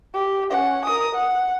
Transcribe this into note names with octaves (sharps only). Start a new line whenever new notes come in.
G4
C#4 F#5
A#4 D#6
F#5